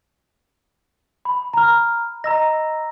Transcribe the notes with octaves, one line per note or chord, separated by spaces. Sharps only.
B5
A#5 F6
D#5 A#5 E6 A#6